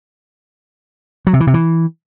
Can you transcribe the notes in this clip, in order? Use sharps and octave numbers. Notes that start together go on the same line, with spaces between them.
F#3
C3
E3
C3
E3